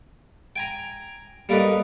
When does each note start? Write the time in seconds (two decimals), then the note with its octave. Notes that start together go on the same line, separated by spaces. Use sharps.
0.56 G5 G#5 A#5
1.49 G3 A#3 A4 B4 D#5